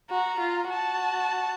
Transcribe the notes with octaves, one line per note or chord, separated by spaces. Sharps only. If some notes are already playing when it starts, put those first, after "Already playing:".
F#4 A#5
F4
F#4 A5